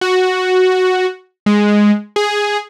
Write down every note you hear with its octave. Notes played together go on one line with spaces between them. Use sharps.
F#4
G#3
G#4